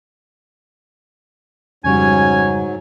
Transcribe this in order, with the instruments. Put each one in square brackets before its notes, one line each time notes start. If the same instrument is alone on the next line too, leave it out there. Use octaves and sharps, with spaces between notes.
[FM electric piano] F2 C#3 G3 [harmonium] G#2 F#3 [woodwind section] C#4 C#5 G#5